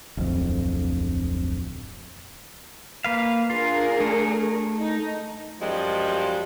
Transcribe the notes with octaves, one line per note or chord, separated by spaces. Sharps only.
D1 B1 F2
A#3 B4 F5
D4 F4 G#4 A#4
A3
D#4
F#2 F3 G3 G#3